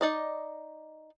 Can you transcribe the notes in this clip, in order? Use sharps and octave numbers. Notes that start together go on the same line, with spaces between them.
D#4 D5 D#5